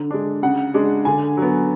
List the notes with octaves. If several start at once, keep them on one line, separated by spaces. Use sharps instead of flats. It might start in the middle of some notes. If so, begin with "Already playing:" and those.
Already playing: D3
G#3 D4
C#3 F#5
G#3 D4
D3 G#5
F#3
B3